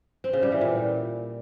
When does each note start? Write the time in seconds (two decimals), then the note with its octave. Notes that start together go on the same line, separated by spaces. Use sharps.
0.24 C4
0.33 C#3
0.43 G3
0.52 E3
0.61 A#2